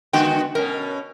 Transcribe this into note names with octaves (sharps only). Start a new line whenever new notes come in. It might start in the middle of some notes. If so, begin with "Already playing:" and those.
D3 G#3 B3 F#4 G5
B2 C#4 A#4